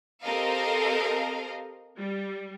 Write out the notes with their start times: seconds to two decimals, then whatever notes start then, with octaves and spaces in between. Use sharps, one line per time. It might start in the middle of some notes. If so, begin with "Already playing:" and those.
0.23 C4 G4 A4 A#4 D#5 F5
1.97 G3